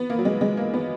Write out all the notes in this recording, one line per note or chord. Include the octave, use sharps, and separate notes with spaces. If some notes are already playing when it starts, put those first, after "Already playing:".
Already playing: B3
A#3
F#3
G#3
G#3
A#3
B3